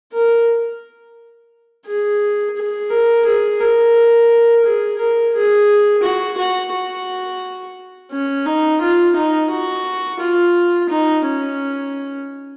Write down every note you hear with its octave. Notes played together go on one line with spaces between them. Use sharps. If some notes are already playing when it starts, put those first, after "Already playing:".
A#4
G#4
G#4
A#4
G#4
A#4
G#4
A#4
G#4
F#4
F#4
F#4
C#4
D#4
F4
D#4
F#4
F4
D#4
C#4